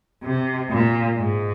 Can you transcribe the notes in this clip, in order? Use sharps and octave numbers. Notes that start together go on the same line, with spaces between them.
C3
A#2
G#2